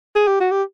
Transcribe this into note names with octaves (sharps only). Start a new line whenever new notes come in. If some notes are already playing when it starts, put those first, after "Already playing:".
G#4
G4
F#4
G4